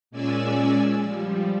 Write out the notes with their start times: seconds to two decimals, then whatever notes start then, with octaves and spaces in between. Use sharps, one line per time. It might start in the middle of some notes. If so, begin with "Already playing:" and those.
0.11 A#2 G#3 C#4 D5 G#5 E6
1.02 F3 G3